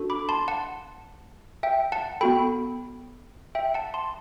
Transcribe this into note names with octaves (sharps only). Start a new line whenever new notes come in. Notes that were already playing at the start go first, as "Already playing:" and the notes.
Already playing: D4 F#4 A4
B5 D6
A5 C6
F#5 A5
E5 G5
F#5 A5
B3 F#4 A4 G5 B5
E5 G5
F#5 A5
A5 C6